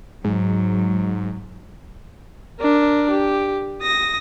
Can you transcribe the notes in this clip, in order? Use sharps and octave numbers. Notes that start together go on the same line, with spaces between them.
G#2 F#3
D4 A#4
G4
D#6 A#6